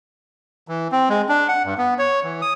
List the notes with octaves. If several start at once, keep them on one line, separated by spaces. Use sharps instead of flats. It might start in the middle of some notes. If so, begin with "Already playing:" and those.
E3
C4
G#3
D4
F#5
G2
B3
C#5
E3
D#6